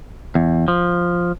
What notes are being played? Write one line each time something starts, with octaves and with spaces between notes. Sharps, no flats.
E2
F3